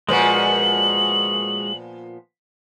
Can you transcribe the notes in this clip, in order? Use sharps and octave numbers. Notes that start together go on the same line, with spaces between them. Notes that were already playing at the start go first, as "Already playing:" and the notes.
A#2 F3 G#3 B3 F#4 F#7